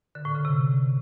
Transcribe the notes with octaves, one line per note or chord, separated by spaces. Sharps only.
D3
A2
C#3
C3